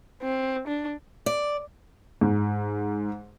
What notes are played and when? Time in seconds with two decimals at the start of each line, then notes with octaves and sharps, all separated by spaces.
0.22 C4
0.67 D4
1.26 D5
2.21 G#2